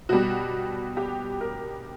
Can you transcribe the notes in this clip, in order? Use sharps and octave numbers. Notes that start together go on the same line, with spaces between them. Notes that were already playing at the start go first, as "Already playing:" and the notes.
B2 G3 F#4
G4
A#4